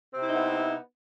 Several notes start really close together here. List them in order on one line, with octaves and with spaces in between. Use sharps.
C4 C3 E4 D#4 B3